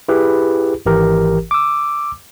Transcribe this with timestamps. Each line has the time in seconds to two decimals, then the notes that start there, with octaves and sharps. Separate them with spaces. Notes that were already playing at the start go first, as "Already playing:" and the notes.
0.09 E4 G4 G#4 B4
0.86 G#1 E3 G4 A#4
1.51 D6 E6